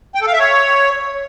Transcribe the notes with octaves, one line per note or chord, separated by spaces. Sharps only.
G5
A4
F5
E5
C#5